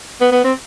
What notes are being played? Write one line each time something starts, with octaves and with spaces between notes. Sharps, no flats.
B3
B3
C4